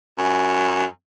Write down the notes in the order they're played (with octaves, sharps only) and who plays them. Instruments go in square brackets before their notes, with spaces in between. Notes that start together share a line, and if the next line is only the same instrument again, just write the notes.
[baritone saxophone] F#2